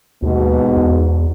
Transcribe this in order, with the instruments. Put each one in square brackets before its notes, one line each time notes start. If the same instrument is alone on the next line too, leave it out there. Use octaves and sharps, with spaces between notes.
[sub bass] D#2 [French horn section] G#2 B2
[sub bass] E2